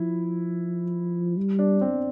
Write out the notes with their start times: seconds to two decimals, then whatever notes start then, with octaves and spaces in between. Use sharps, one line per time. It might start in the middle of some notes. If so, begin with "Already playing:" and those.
Already playing: F3 E4
1.38 G3
1.59 D4
1.81 C4